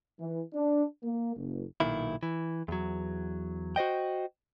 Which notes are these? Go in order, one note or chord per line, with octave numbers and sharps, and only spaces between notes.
E3
D4
A#3
F#1
B1 A#2 D#3 E4
E3
E2 F#3
F#4 C5 D#5 G5